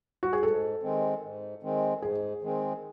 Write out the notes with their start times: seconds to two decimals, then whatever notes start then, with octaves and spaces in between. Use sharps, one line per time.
0.23 F#4
0.33 G#4
0.43 G#2 A4
0.83 D#3 G#3 C4
1.23 G#2
1.63 D#3 G#3 C4
2.02 G#2 G#4
2.42 D#3 G#3 C4